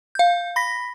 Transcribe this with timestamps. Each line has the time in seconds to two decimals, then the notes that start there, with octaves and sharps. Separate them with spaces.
0.15 F5 G6
0.56 B5 A#6 B6